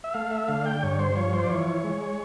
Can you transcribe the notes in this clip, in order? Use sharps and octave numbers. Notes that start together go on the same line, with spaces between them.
E5
A3 F5
E5
D3 F5
G5
G2 C#5
C5
F3 C#5
C5
D5
E3 C#5
G#3